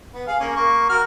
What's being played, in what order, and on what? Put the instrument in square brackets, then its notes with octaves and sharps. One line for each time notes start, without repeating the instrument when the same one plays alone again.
[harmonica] B3
G#4 F5
A#3 C#4 G#4
A#3 C#6
F#4 A#4 F6